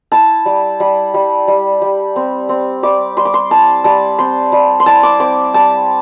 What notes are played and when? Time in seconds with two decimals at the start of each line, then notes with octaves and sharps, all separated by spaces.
0.12 E4 A5
0.46 G3
0.80 G3
1.14 G3
1.48 G3
1.82 G3
2.16 C4
2.49 C4
2.83 G3 D6
3.17 G3 C6
3.25 D6
3.34 C6
3.51 E4 A5
3.84 G3 A5
4.19 C4 C6
4.52 G3
4.80 C6
4.86 E4 A5
5.03 D6
5.20 C4 D6
5.54 G3 A5